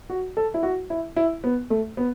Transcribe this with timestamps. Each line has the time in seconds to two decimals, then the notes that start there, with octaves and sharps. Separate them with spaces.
0.10 F#4
0.37 A4
0.54 E4
0.63 F#4
0.90 E4
1.17 E4
1.44 B3
1.70 A3
1.97 B3